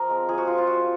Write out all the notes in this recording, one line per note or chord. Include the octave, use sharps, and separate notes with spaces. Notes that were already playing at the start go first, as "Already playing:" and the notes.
Already playing: F3 A#4
G#3 C4
F3 G#4
F#4
G#3 C4 F4
F4
F3 F#4